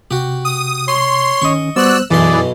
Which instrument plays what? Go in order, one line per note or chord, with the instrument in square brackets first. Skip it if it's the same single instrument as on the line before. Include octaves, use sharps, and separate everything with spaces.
[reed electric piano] C3 [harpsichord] F#4 G4
[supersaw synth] D#6
[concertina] C#5 [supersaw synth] C6
[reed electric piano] D#3 C#4 [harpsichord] D#5 C#6
[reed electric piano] G3 B3 C5 [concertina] F#4 D5 [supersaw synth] E6 F#6
[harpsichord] B1 B2 C6 [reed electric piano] F#2 [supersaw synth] E3 [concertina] G#4 D5